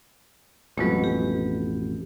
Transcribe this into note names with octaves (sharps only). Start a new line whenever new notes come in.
A1 F2 B2 F#3 G#3
G4